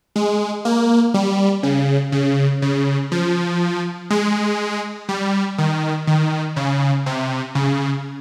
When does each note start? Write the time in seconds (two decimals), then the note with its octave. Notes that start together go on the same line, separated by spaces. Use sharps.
0.16 G#3
0.65 A#3
1.14 G3
1.63 C#3
2.12 C#3
2.62 C#3
3.12 F3
4.10 G#3
5.09 G3
5.58 D#3
6.07 D#3
6.56 C#3
7.06 C3
7.55 C#3